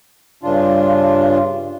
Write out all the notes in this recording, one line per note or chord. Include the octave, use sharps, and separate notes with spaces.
G2 C#3 D4 F4